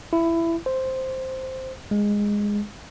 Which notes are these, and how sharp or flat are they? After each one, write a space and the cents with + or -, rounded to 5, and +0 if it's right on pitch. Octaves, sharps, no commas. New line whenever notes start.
E4 +15
C5 +0
G#3 -10